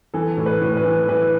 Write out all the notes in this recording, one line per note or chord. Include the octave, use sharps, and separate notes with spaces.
E3 A4
A2
B4
A2
B4
E3
E3 B4